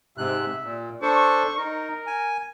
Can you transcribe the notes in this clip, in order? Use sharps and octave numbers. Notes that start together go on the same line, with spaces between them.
G#2 C3 E5 F#6
A#2
D4 A4 C5 C#6
D#4 A#4
G#5